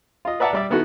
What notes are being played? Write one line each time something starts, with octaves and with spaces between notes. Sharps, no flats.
F4 D#5
B4 D5 E5 F#5 A5 A#5
G3 D5 E5
D#3 B3 E4 F#4 A4